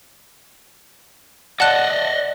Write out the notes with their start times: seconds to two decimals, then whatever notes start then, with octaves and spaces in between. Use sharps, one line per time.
1.60 D5 D#5 F#5 A5 F#6